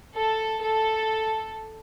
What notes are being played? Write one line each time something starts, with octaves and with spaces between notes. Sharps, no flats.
A4
A4